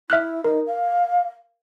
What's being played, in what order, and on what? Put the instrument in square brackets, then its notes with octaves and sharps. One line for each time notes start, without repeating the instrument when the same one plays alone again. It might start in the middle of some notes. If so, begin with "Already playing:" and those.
[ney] E4 [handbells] E5 F6 F#6
[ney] D#4 [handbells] A#4
[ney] F5